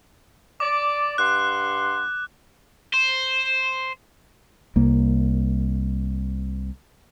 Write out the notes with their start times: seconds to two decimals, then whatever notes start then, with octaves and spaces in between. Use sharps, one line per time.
0.60 D5 D6
1.18 G2 F#5 C6 F#6
2.93 C5
4.76 C2 A#3